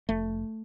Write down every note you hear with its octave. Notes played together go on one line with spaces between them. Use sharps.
F1 A3